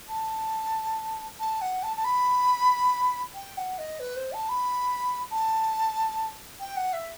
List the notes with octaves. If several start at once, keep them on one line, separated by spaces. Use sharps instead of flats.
A5
A5
F#5
A5
A5
B5
G5
F#5
D#5
B4
C5
A5
B5
A5
G5
F#5
E5